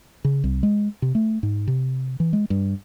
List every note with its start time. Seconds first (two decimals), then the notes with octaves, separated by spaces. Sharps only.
0.25 C#3
0.44 C2
0.63 G#3
1.02 C3
1.15 A3
1.43 G#2
1.67 C3
2.20 E3
2.33 G#3
2.50 G2